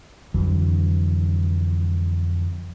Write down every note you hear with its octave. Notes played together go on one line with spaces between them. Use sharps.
F2 D3 E3 F#3